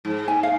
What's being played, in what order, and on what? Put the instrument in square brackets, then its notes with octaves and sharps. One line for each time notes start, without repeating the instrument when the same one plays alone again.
[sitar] G#2
[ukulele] G#5
F5